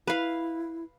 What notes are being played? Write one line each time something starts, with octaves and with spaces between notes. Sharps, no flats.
E4 B4 F5